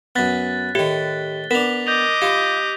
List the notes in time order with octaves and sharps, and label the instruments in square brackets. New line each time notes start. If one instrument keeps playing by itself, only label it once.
[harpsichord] F#2 B3 [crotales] F#6 A6 B6
[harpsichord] A2 D#3 [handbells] G4 C#7 [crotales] G7
[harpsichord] B3 D4 [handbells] A#4 [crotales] B6 F7
[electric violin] D#5 D6 [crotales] G6 F7
[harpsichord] F4 [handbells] G4